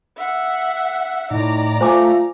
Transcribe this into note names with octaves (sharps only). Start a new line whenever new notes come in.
E5 F#5
A2 D#4 D5 A#5
A3 F4 C5 G#5 D6